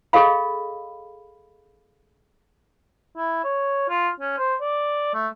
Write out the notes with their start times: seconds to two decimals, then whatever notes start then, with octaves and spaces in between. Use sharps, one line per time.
0.13 G#4 A4 D#5 F5 B5
3.16 E4
3.44 C#5
3.89 F4
4.21 C#4
4.38 C5
4.61 D5
5.14 A3